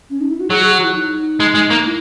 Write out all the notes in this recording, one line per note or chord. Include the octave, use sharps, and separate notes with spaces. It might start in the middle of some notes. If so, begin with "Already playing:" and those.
C#4
D#4
E4
F#4
F#3 G#4
G#4
F#4
E4
D#4
G#3
G#3
A#3
E4